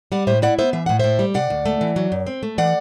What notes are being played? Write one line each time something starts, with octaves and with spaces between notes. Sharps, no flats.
G3 D5 F#5
A2 C5 E5
E4 D5 F#5
B3 C5 E5
E3 E5
A2 F#5
A2 C5 E5
G3
C3 D5 F#5
D2
A3
E3
F#3
F#2
C4
A3
E3 D5 F#5